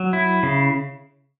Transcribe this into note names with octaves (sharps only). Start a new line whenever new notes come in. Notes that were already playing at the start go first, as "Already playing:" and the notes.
Already playing: F#3
E4
C#3